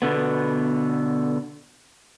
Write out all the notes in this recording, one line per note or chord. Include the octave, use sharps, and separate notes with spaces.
B2 D3 B3